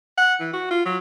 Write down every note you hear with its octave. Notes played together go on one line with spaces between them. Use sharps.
F#5
E3
F#4
F4
F#3